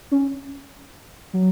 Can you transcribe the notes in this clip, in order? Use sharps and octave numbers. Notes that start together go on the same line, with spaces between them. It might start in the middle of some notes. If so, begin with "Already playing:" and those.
C#4
F#3